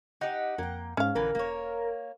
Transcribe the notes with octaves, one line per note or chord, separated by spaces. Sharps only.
D#4 G4 F#5
F2 A#3 G5
G#2 C#4 F5
A#1 D3 E3 A#4 B4
E1 A#3 C#5